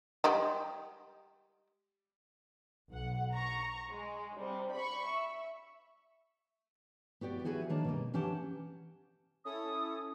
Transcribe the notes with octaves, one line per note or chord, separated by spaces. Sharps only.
G3 G#3 G4
B1 F#5
A#5 C#6
G#3
C3 G3
B5 C#6
E5
B3 F#4 G4 D5
B3 E4 F#4 G#4 A4 B4
D#3 A#3 D4 C#5 A5
B2 G3 A#3
E3 C#4 D4 G4 F#5 A5
C#4 E4 A4 D#6